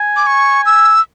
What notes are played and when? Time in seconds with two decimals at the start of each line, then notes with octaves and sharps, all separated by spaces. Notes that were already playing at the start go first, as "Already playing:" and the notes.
Already playing: G#5
0.16 D6
0.27 C#6
0.66 E6